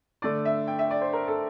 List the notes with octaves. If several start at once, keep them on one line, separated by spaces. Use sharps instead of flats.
D3 A3 D4 D5
E5
G5
E5
D5
C5
A#4
A4